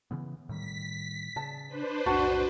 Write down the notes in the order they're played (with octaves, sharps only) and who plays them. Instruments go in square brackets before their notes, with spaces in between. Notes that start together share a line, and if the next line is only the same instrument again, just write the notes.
[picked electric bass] C#3 E3 B3
[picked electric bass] A2 D#3 G3 [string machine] B6
[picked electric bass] C#3 [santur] A5
[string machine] D4 B4 C5
[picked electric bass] B1 F2 A2 [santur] F#4 A5